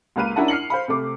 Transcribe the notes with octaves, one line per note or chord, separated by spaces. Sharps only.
C#2 A#3 B4 F5 D#7
C#4 D4 E4 A#4 F#5 A5
F6 C7 C#7 F#7
C5 F5 B5
C3 A3 D6